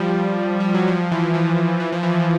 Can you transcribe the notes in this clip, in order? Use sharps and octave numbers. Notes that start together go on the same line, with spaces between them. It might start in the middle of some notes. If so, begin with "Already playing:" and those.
Already playing: F3 G3
G3
F#3
F3
E3
F3
E3
F3
E3
F3